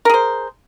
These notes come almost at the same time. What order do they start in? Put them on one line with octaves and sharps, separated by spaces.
A#4 G#4 C5